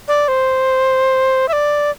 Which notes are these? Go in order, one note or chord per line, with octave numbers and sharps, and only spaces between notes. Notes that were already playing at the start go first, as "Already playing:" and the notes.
D5
C5
E5
D5